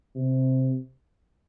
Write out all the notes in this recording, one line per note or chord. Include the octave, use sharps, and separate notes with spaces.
C3